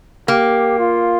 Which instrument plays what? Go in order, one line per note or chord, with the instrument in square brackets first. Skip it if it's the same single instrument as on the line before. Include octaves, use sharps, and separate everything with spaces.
[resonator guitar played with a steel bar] A#3 [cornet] G4
[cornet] F4